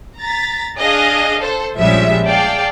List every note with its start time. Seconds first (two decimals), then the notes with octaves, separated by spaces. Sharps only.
0.21 A#5 A6 B6
0.80 D4 G#4 D#5 F5
1.40 A4 C5
1.77 A#1 F3 G3 G#3 C#4 E5
2.26 G#4 D5 F5 G5 A5